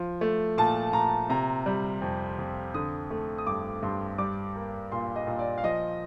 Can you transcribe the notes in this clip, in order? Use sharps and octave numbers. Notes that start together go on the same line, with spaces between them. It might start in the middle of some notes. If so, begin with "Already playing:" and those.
Already playing: F3
A3
A#2 A5
A#2 A#5
C3 A#5
G3
F2
F2
D3 D#6
A3
D#6
G2 D6
G2 C6
G3 D6
A#3
A#2 C6
D#5
A#2
D5
F5
F3 D#5